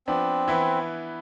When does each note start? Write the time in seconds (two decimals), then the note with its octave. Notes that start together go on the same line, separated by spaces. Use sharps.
0.07 F3 B3 C4 D4
0.48 E3 B3 E4